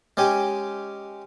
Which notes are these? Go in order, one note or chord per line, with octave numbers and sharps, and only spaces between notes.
G#3 C#4 G4 G#5